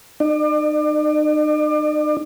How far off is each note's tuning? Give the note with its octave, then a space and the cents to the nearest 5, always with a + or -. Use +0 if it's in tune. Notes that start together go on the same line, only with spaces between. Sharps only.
D#4 -40 D5 +35